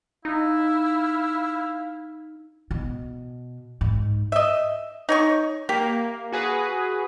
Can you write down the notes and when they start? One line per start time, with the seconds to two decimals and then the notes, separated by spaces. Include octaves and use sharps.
0.25 D#4 E4 F5
2.71 B2
3.81 G#2
4.32 D#5 E5
5.09 D#4 C#5 C#6
5.69 A#3 G4
6.32 F#4 G#4 B4